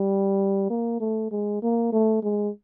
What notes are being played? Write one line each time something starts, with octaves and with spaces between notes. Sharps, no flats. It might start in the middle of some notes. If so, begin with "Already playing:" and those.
Already playing: G3
A#3
A3
G#3
A#3
A3
G#3